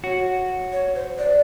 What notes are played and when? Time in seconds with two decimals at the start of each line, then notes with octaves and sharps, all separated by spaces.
0.04 F#4 C#5
0.73 C#5
0.95 C5
1.18 D5